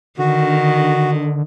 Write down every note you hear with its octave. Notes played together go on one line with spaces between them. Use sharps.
D3 D#3 F#4